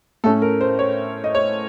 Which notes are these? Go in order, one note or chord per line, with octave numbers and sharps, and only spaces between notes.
A2 A3 C#4 A4
A#4
C5
C#5
D#5
C#5